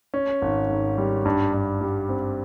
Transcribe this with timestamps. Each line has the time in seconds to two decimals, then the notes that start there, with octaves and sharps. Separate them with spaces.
0.14 C#4
0.42 G#1
0.69 G#2
0.98 G3
1.25 G2
1.53 G2
1.81 G3
2.09 C4